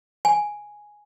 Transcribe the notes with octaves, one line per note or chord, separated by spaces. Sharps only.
G#5